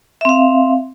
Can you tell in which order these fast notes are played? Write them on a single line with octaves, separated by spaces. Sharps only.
E5 C4 F5